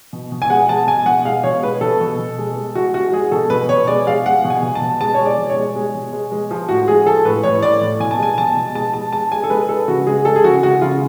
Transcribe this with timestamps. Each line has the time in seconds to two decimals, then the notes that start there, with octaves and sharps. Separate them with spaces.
0.13 B2
0.32 B2
0.42 G#5
0.50 G#3 F#5
0.69 G#3 A5
0.87 B2 G#5
1.06 B2 F#5
1.25 G#3 F5
1.44 B2 C#5
1.62 G#3 B4
1.81 B2 A4
2.01 B2
2.19 B2
2.38 G#3
2.56 G#3
2.75 G#3 F#4
2.94 G#3 F#4
3.12 G#3 G#4
3.32 B2 A4
3.50 B2 B4
3.69 B2 C#5
3.87 G#3 D5
4.07 G#3 F5
4.25 G#3 F#5
4.44 B2
4.50 G#5
4.63 B2
4.75 A5
4.82 B2
5.01 G#3 A5
5.14 G#3 C#5
5.26 D5
5.38 B2
5.50 C#5
5.56 G#3
5.76 G#3
5.95 B2
6.13 G#3
6.32 G#3
6.51 F3
6.69 A2 F#4
6.88 G#3 G#4
7.06 F3 A4
7.25 A2 B4
7.43 A2 C#5
7.62 A2 D5
7.81 A2
8.00 B2 G#5
8.11 A5
8.19 G#3 G#5
8.38 B2 A5
8.57 B2
8.75 G#3 A5
8.94 G#3 A5
9.13 G#3 A5
9.32 G#3 G#5
9.44 A4
9.50 G#3 B4
9.69 G#3 A4
9.88 C#3 F#4
10.07 G#3 G#4
10.25 G#3 A4
10.36 G#4
10.44 C#3 F#4
10.63 G#3 F#4
10.81 C#3 F4